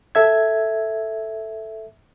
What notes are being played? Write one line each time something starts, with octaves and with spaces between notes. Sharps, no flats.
A4 E5 G#6